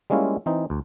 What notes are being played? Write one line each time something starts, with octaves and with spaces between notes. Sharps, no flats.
G3 G#3 A#3 C#4 E4 F4
E3 C4 D#4
D2